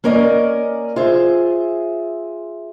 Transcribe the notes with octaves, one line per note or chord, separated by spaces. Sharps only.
A#3 C#4 A#4 D5 D#5
F4 G#4 C5 E5